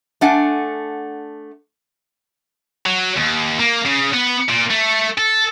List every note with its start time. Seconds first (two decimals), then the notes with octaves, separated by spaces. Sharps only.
0.21 A3 D4 F#5 G#5
2.86 F#3
3.17 D#2
3.60 A#3
3.86 C#3
4.13 B3
4.49 A#2
4.70 A3
5.18 A4